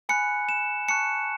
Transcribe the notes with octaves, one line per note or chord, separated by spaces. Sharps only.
G#5 B5 F#6 C#7
E7
A5 C#6 F#6 C#7